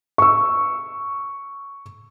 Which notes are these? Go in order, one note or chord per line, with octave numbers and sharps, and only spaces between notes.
C#6 E6